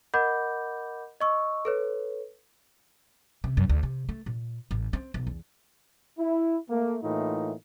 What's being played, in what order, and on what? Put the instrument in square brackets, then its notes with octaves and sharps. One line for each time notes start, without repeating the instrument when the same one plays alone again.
[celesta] A#4 D#5 F#5 B5 D6 G6
D#5 C#6 E6
A4 B4 C#5
[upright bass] C3
F#2
D2
C3
A3
A#2
A1
C4
B1
E2
[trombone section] E4
A3 A#3
A2 E3 A#3 D#4 F4